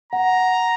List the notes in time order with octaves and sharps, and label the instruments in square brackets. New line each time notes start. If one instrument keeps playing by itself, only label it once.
[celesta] F#5 [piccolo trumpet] A#5